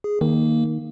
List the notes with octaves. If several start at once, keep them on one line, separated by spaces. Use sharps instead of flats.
G#4
D#3 A#3